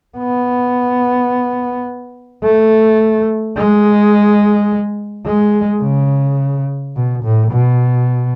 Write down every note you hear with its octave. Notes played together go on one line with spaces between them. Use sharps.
B3
A3
G#3
G#3
C#3
B2
A2
B2